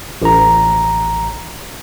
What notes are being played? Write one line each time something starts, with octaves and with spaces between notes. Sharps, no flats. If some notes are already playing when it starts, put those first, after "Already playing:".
A1 A#5